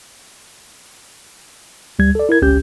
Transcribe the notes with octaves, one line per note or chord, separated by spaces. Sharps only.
D2 G3 G#6
A4 D5
E4 A#4 G#6
G1 C#2 C#4 G4 G6